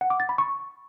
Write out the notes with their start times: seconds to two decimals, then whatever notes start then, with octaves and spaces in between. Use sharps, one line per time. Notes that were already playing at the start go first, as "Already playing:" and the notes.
0.01 F#5
0.10 D6
0.20 A6
0.29 B5
0.38 C#6